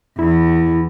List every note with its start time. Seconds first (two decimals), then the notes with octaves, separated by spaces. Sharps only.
0.19 E2 E4